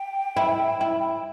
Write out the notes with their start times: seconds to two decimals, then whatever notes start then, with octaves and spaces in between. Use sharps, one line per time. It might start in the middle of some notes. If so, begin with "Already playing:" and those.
Already playing: G5
0.37 E4
0.81 E4